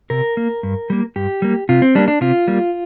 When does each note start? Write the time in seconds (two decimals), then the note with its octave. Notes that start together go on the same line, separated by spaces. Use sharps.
0.10 C3 A#4
0.37 A#3
0.63 G2
0.90 G3 A#3
1.16 G2 G4
1.42 G3 A#3
1.69 C3 F4
1.82 C4
1.95 G3 A#3 D4
2.08 D4
2.21 C3 F4
2.48 G3 A#3